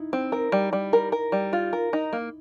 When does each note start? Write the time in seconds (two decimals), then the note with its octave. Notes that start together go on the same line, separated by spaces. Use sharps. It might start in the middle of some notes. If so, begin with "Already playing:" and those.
Already playing: D#4 E4
0.13 C4
0.32 A#4
0.52 G3
0.73 G3
0.93 A#4
1.12 A#4
1.32 G3
1.53 F4
1.73 A#4
1.93 D#4
2.13 A#3